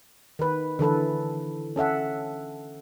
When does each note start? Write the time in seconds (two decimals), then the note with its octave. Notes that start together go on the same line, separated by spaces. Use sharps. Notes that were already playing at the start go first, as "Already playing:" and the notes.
0.39 D#3 B4
0.79 D3 E3 A4 B4
1.76 C#4 A4 E5 F#5